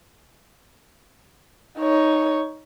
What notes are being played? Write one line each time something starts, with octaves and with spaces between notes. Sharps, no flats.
D#4 C#5